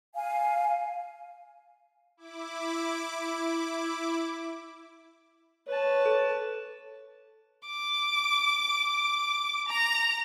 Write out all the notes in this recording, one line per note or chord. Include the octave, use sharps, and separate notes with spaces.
F5 G#5
E4 D6
B4 C#5 A5
A4
D6
A#5